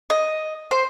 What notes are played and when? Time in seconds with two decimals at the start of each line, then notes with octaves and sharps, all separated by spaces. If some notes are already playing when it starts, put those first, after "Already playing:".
0.10 D#5
0.71 C5